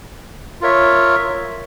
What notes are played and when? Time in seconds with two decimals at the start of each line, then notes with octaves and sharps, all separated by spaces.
0.61 F4 A#4 C#5 E5